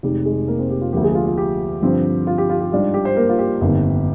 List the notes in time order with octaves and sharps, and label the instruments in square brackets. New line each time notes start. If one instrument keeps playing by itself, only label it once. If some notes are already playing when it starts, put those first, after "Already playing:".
[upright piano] F1 F2 D#3 G#3 D#4 G4
G#3 G#4
A#3 A#4
C4 C5
G4
F4
D2 D3 F3 A#3 G4
G#3 G#4
F4
F4
G4
G2 D3 F3 C4
F4
G4
F4
G4
G#2 G3 D4 F4
G4
C5
A#3 A#4
F4
G4
G1 F2 D#3 A#3